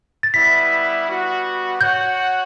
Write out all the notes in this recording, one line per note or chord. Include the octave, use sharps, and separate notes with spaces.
A6
G3 B3 E4 B4 B6
G3 B3 F#4
F#4 C#5 F#5 G6